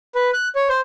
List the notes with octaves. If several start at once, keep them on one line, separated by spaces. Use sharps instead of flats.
B4
F#6
C#5
C5